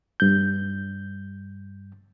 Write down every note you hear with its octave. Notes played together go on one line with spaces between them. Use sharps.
G2 G6